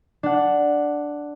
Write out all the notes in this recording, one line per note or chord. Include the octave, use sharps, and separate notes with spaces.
D4 F#5